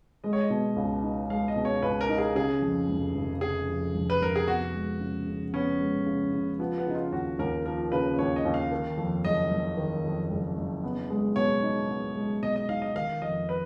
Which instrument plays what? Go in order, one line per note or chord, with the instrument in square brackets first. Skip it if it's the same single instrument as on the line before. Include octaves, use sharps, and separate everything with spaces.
[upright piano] G#3 [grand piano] D#5
[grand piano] C#5
D#5
[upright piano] B2
C#2
D#4
[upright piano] G#3 [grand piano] F5
[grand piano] D#5
[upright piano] B2
[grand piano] C#5
[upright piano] C#2 [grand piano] B4
[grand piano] A#4
[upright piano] D#4
[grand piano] G#4
[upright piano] C#3 [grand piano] G#4
[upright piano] F2
F1
F1
[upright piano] C#3 [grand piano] G#4
[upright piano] F2
F1
[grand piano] B4
[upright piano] F1 [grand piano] A#4
[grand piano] G#4
[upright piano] B3 [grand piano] F#4
[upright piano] G#3
C#3
C#3
[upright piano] B3 [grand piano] C#4
[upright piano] G#3
C#3
C#3
[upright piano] F3 [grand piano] B3
[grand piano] B3
[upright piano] C#3 [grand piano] D#4
[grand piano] F4
[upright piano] D#2 [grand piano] F#4
[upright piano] D#2 [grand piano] A#4
[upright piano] F3 [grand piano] A#4
[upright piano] C#3 [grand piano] B4
[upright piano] D#2 [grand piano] C#5
[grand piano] D#5
[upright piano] D#2
[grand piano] F5
[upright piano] D#3
F2
[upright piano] F#1 [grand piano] D#5
[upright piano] F#1
D#3
F2
F#1
F#1
B3
G#3
[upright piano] B2 [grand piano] C#5
[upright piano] D#4
B3
G#3
[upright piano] B2 [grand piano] D#5
[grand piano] D#5
[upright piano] D#4 [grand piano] F5
[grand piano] D#5
[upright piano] D#3 [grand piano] F5
[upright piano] F2 [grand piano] D#5
[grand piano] B4